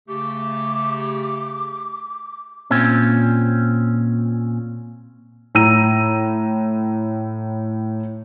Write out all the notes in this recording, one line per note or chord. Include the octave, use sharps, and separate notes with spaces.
C#3 A3 G4 D6
A#2 C4 C#4
A2 A#5 E6 D#7